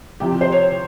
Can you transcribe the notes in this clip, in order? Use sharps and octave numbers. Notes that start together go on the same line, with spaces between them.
C2 C3 F3 G4
G4
C5
C#5